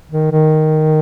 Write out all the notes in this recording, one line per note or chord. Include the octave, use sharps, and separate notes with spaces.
D#3
D#3